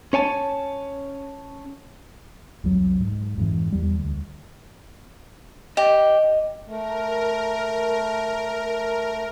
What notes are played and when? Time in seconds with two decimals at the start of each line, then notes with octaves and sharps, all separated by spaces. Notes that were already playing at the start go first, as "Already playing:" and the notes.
0.13 C#4 C#5 G#5 A5
2.64 C2 F2 F#3
3.00 G#2
3.37 F2 G#2 E3
3.72 E2 G3
3.98 D2
5.77 G4 D#5
6.67 A3 A#4